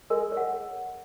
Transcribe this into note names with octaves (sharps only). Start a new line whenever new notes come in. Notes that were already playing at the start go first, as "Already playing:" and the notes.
G#3 A#4
C#5
F#5